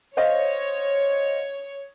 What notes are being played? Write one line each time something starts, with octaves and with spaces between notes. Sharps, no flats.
C5 C#5 D#5 F5